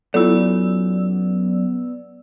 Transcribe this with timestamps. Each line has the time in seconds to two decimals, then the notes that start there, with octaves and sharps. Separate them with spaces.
0.14 F#2 B3 E4 F4 A4 D5 E6